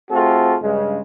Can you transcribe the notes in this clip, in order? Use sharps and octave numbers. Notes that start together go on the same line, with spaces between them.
A3 C4 F4 F#4 G#4 A4
G2 C#3 G#3